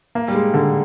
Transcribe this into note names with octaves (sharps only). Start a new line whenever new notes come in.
A#3
G3
G#3
D3